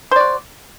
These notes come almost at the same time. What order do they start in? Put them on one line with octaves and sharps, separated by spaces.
C5 D5 F#4